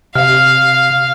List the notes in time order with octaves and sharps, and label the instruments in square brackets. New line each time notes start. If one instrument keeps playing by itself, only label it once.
[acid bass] C3 [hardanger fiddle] F5 [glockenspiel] F6